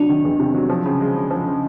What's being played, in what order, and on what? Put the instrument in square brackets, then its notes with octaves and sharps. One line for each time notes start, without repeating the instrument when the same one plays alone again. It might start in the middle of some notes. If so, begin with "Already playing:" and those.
Already playing: [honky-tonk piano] C3 F#3 [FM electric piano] D4
[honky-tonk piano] D#3
E2
C3
F#3
F3
C#3
G#3
C#3
F3
C#3